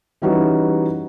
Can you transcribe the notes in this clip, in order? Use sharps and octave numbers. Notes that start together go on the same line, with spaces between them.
E3 G3 C#4 D#4 F#4 B4